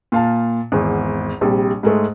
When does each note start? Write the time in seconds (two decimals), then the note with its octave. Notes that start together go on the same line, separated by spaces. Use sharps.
0.12 A#2 F5 A5
0.72 G#1 E2
1.41 A#1 C3 G3
1.83 G#2 G#3 A3